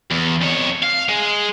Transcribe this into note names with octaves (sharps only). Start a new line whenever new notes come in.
E2
F2 C#5
F5
G#3